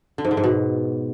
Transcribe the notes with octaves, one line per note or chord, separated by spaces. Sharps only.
D3
G#2
D3
G#2
B2